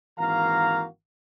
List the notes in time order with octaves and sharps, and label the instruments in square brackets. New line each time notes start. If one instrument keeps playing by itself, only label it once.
[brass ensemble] G#1 E3 A#3 F#4 F5 A#5